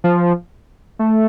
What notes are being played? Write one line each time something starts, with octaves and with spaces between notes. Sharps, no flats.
F3
A3